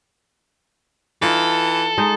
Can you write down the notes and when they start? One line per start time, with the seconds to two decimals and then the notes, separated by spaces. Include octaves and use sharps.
1.22 E3 D#4 F4 A4
1.98 G#3 D#4